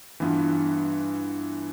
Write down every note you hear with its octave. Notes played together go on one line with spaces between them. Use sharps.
G2 E3 B3 F4